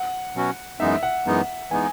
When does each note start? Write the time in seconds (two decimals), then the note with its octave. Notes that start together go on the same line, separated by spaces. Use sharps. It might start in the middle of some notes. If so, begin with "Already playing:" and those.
Already playing: F#5
0.34 B2 F#3 C#4 F#4
0.80 F#2 E3 G#3 B3 D#4 E5
1.03 F#5
1.25 F#2 E3 G#3 B3 D#4
1.71 E3 G#3 B3 D#4 G#5